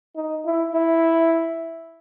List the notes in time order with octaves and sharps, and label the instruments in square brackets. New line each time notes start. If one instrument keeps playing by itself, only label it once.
[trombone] D#4
E4
E4